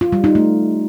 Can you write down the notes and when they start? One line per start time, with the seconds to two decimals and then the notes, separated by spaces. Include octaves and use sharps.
0.01 F4
0.13 G3
0.24 D#4
0.35 A3